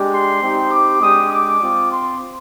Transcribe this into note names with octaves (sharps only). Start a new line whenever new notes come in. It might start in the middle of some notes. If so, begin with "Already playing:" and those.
Already playing: G#3 D4 G4
C6
C4 D#4 G4
D6
G#3 D4 G4 D#6
D6
C4 F4
C6